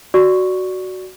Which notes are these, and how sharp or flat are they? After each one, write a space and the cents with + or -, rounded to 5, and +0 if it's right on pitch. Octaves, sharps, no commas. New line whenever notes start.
F#4 +5 D5 +0 C#6 +0